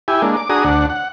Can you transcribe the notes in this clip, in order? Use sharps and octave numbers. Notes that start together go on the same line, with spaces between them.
E4 G4 G#5
G#3 A#3 D4
D6
D4 F#4 G#4 A#5 D#6
D2 D4 F#5
F#5